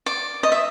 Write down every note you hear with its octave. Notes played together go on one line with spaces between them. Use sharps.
D5
D#5
E5